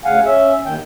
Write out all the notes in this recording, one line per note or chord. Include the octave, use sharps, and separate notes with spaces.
D2 C#3 F5 F#5 G#5
C#4 E5
D#2 D#3 G5